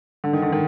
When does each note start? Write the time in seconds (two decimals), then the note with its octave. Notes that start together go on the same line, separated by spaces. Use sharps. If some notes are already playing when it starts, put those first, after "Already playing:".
0.24 D3
0.33 D#3
0.42 D3
0.52 D#3